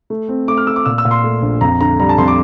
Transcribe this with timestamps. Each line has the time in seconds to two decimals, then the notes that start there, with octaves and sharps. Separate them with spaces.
0.10 A3
0.29 C4
0.48 A3 D6
0.57 F6
0.67 A3 E6
0.76 D6
0.85 A#2 E6
0.98 E6
1.05 A#2
1.11 C6
1.24 A3
1.42 A#1
1.61 F2 A#5
1.81 D3 A#5
2.00 G3 A#5
2.09 A5
2.18 F2 C6
2.28 D6